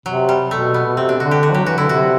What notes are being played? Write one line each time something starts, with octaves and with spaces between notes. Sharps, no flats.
C3 F#3
G3
B2 A3
B3
B2
C3 C4
D4
D3 F#4
G4
F#4
F#3 G4
E3 F#4
D3 E4
C3 F#4